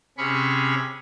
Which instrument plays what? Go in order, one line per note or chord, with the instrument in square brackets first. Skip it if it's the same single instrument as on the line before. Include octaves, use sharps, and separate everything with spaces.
[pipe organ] C3 C#4 G#4 B5 C#6